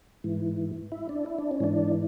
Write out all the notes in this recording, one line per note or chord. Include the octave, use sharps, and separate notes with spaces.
G#2 E3
E4
D4
E4
D4
C#4
G#2 E3 D4